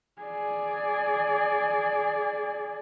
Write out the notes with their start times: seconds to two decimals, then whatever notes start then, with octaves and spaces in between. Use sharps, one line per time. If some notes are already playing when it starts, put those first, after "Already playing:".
0.22 G#4 D5